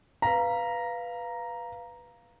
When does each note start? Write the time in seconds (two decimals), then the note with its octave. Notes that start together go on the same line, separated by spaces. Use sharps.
0.22 B4 F5 A#5 B6